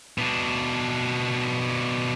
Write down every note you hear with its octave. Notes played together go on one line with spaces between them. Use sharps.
B2 D4